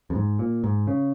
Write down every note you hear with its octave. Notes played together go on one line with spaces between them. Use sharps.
F2
G#2
A#2
G#2
C#3